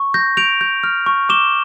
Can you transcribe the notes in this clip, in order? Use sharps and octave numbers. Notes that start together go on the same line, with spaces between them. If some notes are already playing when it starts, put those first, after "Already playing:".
Already playing: C#6
G6 A#6
G6 D7 F7
G6
F6
C#6
D6 E7 G7